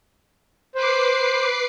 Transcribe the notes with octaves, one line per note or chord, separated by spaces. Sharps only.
B4 C5 D6 C7